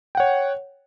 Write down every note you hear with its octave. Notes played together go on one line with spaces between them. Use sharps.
C#5 F#5 G5